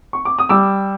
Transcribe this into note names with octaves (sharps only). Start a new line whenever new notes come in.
C#6
D6
D#6
G3 D6 E6